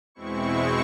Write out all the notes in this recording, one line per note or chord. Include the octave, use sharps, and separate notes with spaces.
E2 B2 G#3 C4 E4 C#6